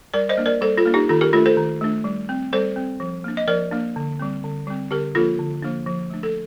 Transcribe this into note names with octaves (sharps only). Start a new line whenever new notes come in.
G3 A#4 D5
C5 D#5
A#3 D4
A#4 D5
G3 A4 C5
F4 A4
A#3 D4
D#4 G4
D#3 F4 A4
G4 A#4
A3 D4 F4 A4
A4 C5
D#3
A3 D4
G3
C4
G3 A4 C5
C4
F3
A#3 D4
D#5
F3 A#4 D5
A#3 D4
D3
G3 C4
D3
G3 C4
D3 G4 A#4
F3 A#3 D4 F4 A4
D3
F3 A#3 D4
F3
A3 D4
A4